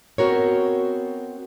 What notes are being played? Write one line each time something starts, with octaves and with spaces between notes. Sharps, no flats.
B3 C4 F#4 A#4 C#5